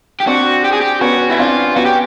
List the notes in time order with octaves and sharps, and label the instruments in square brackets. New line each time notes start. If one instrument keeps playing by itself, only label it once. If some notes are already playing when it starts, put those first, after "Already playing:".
[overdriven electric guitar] G4
[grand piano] C4 D4 [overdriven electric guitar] F#4
[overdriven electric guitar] G4
G#4
G4
[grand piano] B3 C#4 [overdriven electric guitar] F#4
[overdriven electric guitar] E4
[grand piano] C4 D4 [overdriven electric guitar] F4
[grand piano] B3 C#4 [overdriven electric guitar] F#4
[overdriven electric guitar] G4